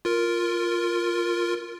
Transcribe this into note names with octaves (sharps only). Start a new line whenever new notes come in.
F4 A#4